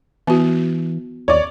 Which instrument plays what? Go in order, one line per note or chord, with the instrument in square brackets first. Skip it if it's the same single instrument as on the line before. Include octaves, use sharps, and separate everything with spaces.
[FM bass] E3 [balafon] B3 F#4
[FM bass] D#2 [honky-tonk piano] C#5 D5